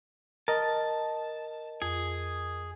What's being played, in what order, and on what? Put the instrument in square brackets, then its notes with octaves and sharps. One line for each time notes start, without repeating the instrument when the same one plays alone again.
[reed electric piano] A#4 D#5 [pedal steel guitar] A5
[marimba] F2 [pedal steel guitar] G#4